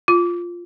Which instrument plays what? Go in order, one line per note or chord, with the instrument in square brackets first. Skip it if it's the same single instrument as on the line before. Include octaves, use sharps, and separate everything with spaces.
[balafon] F4